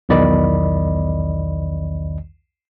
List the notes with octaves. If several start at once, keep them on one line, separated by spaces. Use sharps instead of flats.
B1 E2 D#3 D5 D#5 B5